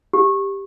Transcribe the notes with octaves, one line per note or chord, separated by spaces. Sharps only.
G4